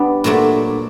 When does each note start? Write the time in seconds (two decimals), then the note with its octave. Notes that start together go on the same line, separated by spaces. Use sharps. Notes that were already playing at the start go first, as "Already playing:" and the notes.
Already playing: G3 B3 D4
0.24 A#2 F#3 A3 D4